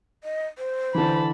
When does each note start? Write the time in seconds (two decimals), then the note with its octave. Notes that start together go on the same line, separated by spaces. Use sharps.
0.24 D#5
0.58 C5
0.95 D3 E3 A5 B5